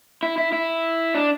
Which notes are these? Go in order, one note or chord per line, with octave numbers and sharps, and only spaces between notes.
E4
E4
E4
D4